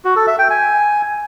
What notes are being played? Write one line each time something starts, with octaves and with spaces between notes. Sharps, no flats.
F#4
A4
E5
G5
G#5